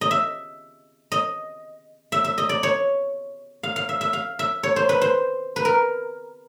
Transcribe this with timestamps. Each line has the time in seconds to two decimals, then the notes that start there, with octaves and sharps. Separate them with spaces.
0.01 D#5
0.11 E5
1.12 D#5
2.12 E5
2.24 E5
2.38 D#5
2.49 D5
2.63 C#5
3.63 F5
3.76 F5
3.89 E5
4.01 E5
4.13 F5
4.39 E5
4.63 C#5
4.76 C5
4.89 B4
5.02 C5
5.56 B4
5.65 A#4